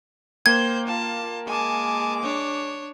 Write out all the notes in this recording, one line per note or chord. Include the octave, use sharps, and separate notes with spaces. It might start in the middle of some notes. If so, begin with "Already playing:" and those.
A#3 C5 G5 G6 G#6
F4 A5
G#3 G#5 A5 D6
D4 C#5